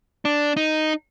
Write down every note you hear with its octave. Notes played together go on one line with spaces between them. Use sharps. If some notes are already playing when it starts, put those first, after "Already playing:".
D4
D#4